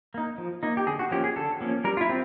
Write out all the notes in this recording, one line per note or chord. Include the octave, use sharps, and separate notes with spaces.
A#3 D#4
F3
A#3 D#4
G4
D3 G#4
F#4
F3 A#3 C#4 G4
G#4
D3 A4
F3 A#3 C#4
G3 A#4
F4
E4
C4